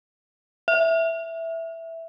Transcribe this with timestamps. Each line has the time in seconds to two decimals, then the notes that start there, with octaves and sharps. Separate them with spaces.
0.68 E5